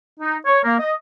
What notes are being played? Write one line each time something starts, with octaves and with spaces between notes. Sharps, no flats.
D#4
C#5
A#3
D#5